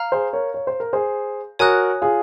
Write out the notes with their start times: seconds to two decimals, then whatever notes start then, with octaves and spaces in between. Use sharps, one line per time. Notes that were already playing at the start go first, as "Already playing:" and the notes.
Already playing: F5 A#5 F6
0.12 G#4 C5
0.33 A#4 C#5
0.54 C#5
0.67 C5
0.80 A#4
0.93 G#4 C5
1.59 F#4 A#4 C#5 G#5 D#6 F#6
2.02 F4 G#4